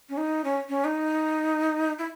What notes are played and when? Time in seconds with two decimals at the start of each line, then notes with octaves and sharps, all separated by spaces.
0.09 C#4
0.17 D#4
0.44 C#4
0.69 C#4
0.85 D#4
1.99 E4